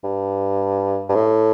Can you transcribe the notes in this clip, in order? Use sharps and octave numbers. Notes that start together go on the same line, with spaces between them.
G2
G2
A2